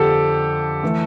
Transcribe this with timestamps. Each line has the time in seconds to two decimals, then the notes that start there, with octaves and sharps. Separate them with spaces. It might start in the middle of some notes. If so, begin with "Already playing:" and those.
Already playing: F2 D3 F3 G4 A4
0.83 E3 A3